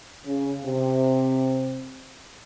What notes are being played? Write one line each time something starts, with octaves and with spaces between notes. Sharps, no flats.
C#3
C3